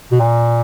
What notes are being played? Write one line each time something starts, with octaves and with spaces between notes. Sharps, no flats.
B2
A#2